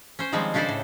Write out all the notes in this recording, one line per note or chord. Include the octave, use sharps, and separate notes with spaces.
C#4 C5
D#3 F3 G3 G#3 C4
C#3 D4 G4 A4 C5 D5
A2